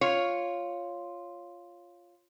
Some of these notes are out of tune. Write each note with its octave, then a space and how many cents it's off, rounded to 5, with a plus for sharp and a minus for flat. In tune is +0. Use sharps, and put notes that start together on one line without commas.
F4 +0 C#5 +0